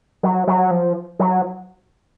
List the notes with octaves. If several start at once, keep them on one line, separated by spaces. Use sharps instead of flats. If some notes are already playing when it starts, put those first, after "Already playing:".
F#3
F#3
F3
F#3